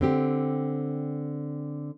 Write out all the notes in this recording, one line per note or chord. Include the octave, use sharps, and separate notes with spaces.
D3 C4 G4